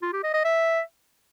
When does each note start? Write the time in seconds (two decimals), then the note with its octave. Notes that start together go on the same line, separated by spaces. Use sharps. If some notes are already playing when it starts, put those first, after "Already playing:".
0.02 F4
0.13 G4
0.23 D#5
0.34 D#5
0.44 E5